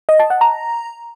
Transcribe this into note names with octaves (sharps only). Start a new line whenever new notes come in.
D#5
A5
F#5
A#5